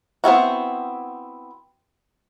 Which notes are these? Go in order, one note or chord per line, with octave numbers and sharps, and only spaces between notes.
B3 C4 E4 F#4